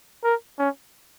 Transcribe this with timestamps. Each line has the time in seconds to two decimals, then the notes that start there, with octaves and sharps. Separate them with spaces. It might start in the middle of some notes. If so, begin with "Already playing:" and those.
0.24 A#4
0.59 C#4